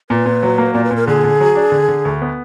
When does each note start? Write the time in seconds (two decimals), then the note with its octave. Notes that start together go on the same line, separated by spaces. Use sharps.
0.10 A#2 B4
0.26 A#2
0.43 F#3
0.58 A#3
0.73 A#2 D5
0.84 B4
0.91 A#2
0.96 A#4
1.07 D3 G#4
1.24 D3
1.40 F#3
1.55 D4
1.72 D3
1.88 D3
2.05 D2
2.21 B3